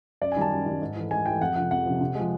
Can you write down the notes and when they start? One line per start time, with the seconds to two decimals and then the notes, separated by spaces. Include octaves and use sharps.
0.21 F#2 D5
0.32 G#5
0.36 D#3 G3 A5
0.52 F#2
0.66 D#3 G3
0.82 G#2
0.96 E3 A3
1.11 G#2 G#5
1.26 E3 A3 G5
1.41 F2 F#5
1.55 C3 F3 F#5
1.71 F2 F#5
1.86 C3 F3
2.01 C3
2.15 F3 G#3